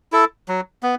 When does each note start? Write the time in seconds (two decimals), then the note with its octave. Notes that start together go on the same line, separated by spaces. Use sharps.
0.12 E4 A4
0.48 F#3
0.83 B3